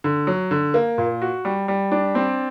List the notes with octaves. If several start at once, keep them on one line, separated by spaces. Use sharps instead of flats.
D3
F#3
D3
A#3
A#2
F#4
G3
G3
D4
C4